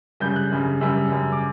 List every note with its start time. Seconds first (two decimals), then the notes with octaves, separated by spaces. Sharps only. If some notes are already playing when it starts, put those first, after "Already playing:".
0.20 F#2 C#3 G3 G6
0.36 F#6
0.52 F#2 C#3 G3
0.81 F#2 C#3 G3 E6
1.11 F#2 C#3 G3
1.32 D6